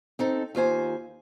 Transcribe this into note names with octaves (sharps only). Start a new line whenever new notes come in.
C4 D#4 A4
D#2 F4 C5 G#5